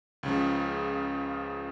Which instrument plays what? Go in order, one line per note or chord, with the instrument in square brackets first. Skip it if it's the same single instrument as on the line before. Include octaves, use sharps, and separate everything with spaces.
[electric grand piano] C#2 C#3 F3